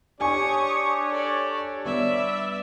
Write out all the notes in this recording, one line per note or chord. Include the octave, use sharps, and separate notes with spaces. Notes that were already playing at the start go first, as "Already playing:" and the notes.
D4 G4 C#5 G#5 C#6 D#6
A4 D5
G3 B3 D5 E5